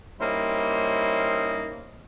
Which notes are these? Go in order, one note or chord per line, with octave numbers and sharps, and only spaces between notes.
G3 A#3 C#4 D#4 E4 C5